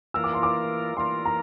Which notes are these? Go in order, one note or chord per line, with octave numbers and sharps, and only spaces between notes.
E3 A#3 F4 A#4 E6
D6
C6
D6
E3 A#3 F4 A#4 C6
A#5